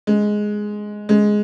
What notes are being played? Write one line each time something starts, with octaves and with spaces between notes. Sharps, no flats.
G#3
G#3